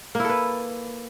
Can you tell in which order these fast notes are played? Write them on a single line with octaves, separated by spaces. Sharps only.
A#3 E4 A4 B4